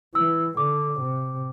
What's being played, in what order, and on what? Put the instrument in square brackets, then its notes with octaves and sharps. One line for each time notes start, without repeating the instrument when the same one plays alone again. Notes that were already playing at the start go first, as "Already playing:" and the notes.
[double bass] E3 [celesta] E6
[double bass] D3 [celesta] D6
[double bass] C3